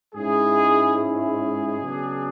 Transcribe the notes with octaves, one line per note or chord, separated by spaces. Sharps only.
G#2 G#3 C#4 E4 G#4
G#4
C#3 F#3 B3 D4